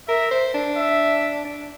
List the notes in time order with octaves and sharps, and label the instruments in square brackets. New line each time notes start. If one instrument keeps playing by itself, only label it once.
[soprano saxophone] A#4 [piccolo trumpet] E5
[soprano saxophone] C5
D4
[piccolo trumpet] E5
[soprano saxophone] D4